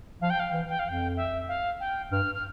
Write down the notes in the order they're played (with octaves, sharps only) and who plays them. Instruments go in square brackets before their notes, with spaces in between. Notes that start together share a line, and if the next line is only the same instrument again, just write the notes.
[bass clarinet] F3 [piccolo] F5
[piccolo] G5
F5
[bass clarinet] E3
[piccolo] G5
F5
[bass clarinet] F2 [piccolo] G5
[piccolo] E5
F5
G5
[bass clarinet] G2 [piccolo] F6
[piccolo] F6